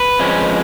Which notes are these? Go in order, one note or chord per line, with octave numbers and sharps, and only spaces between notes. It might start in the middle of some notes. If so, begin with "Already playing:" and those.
Already playing: B4
F2 F3 G#3 C#4